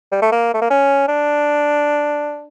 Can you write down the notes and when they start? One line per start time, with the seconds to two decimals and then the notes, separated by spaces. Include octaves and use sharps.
0.12 G3
0.22 A3
0.32 A#3
0.54 A3
0.62 A#3
0.70 C#4
1.08 D4